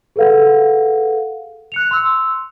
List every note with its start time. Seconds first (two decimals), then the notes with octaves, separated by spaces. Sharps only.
0.16 G#4 A4 B4 F5 F#5
1.72 F#6 C#7 F7
1.91 C6 E6